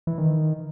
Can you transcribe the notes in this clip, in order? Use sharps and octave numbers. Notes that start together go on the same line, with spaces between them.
E3
D#3